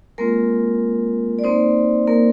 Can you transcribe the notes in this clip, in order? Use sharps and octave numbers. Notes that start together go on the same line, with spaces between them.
G#3 A#3 C4 F4 A#4
D5
A#3 C4 D#4 C5
A#3 A#4